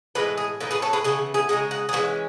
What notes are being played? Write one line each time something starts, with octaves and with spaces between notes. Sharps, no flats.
A2 E3 G#3 B4
G#4
A2 E3 B3 D#4
G#4 B4
A4 C#5
G#4 B4
C#3 E3 B3 G#4
G#4
C#3 G#3 D#4 G#4
F#4
G#4
E3 G#3 C#4 F#4